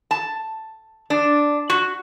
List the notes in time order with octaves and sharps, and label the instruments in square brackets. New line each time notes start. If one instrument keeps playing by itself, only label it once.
[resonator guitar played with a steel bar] A5
D4
F#4